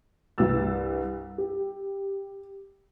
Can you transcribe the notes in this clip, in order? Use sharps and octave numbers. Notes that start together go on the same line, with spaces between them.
C2 G2 E3 E6 A6
G4